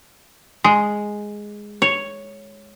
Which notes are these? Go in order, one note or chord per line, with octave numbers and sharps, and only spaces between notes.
G#3
C#5